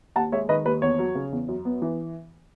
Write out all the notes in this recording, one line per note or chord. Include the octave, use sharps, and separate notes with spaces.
D#2 F#5 A5
G#3 C#5 E5
D#3 B4 D#5
D#2 B4
E2 C#5
F#3
C#3
E2
F#2
B3
E3